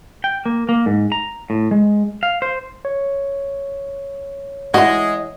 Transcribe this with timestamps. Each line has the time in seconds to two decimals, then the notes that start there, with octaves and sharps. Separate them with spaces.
0.24 G5
0.46 A#3
0.69 A#3
0.86 G#2
1.12 A#5
1.50 A2
1.71 G#3
2.23 F5
2.42 C5
2.85 C#5
4.74 E3 G#3 F#4 D#5